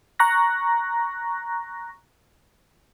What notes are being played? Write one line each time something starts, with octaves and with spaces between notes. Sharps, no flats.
A#5 C#6 F#6 A#6